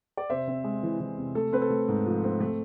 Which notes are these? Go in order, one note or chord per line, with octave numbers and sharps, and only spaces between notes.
D5
C3 C5 E5
C4
G#3
E3
E3
C3
A3 A4
C4 B4
A4
A3
G#2
F3
C4
A3